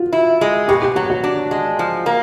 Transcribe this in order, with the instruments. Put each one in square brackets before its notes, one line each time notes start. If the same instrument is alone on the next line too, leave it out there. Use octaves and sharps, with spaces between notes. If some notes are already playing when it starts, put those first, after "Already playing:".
Already playing: [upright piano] F4 F#4
[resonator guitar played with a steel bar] E4
G#3
[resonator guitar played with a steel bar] B2 [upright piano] G4
[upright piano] G4
[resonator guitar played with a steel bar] F#3 [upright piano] F#4
[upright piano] F#4
[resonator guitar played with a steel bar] D4
G#3
F3
A#3